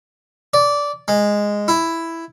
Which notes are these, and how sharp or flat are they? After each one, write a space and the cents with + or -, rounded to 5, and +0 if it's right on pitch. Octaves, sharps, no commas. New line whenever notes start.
D5 -15
G#3 -10
E4 +5